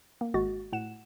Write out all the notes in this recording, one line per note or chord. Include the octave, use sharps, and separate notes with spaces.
A#3
G#1 G#3 F#4 A6
A2 F#5 E7